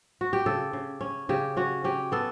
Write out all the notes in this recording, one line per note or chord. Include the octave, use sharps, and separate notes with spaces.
F#4
G4
C#3 A4
C#3
C#4
C#3 G4
C#4 F#4
C#4 G4
B3 A4